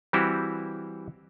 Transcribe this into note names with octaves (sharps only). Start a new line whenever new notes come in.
E3 G3 C4 E4 F#4 G4